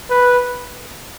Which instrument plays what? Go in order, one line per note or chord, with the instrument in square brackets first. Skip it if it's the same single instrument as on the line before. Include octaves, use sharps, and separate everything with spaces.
[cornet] B4